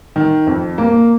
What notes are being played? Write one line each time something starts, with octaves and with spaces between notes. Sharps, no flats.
D#3
F2
A#3